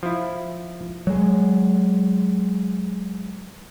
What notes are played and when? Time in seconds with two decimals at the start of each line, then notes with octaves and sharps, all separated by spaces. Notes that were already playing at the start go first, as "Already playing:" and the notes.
0.03 F3 E4
1.07 F#3 G#3